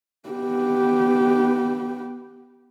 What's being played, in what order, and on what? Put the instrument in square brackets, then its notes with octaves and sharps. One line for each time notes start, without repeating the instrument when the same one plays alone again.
[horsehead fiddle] B3 G4